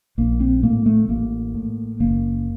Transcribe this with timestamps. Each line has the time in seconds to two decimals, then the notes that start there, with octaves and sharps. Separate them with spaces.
0.18 A#1 A#3
0.40 C4
0.63 A2 A#3
0.86 A3
1.09 A1 A#3
1.55 A2
2.00 F#1 A#3